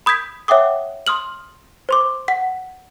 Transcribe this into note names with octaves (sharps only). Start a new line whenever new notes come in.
B5 D#6 G6 G#6 B6
C#5 E5 F#5 G5 D6 D#6
C6 D#6 F6 F#7
C5 C6 D6
F#5 B6